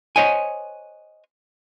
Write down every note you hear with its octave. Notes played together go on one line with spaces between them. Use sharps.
C5 C#5 D#5 F#5 G#5